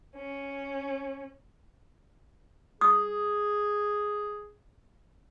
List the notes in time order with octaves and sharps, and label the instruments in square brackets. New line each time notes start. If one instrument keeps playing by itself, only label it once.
[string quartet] C#4
[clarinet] G#4 [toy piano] D#6